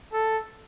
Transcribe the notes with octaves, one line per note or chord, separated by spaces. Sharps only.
A4